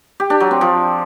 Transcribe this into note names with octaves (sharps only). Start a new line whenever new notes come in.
G4
D4
F#3
C4
F3